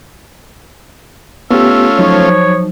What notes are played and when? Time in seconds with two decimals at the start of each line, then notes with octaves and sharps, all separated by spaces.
1.51 A3 B3 C#4 F4 G4 E6
1.99 F3 F#3 D#4 C#5